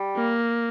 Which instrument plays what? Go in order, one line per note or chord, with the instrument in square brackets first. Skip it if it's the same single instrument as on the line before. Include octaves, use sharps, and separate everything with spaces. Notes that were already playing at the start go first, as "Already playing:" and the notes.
Already playing: [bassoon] G3
[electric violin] A#3